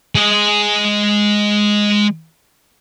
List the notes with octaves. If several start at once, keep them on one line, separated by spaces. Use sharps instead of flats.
G#3 D#5